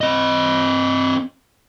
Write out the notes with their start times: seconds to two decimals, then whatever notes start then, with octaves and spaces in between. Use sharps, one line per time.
0.01 C4 D#5